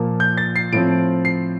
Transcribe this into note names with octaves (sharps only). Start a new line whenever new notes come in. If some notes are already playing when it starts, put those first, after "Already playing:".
Already playing: A#2 F3 A#3
G6
A6
C7
A2 F3 C4 D7
C7